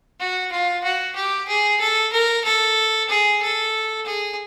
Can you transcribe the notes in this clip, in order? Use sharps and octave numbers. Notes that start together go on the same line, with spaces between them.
F#4
F4
F#4
G4
G#4
A4
A#4
A4
G#4
A4
G#4